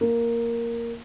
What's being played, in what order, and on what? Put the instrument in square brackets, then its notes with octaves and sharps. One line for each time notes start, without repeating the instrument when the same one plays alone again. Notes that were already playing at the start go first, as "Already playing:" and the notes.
[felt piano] A#3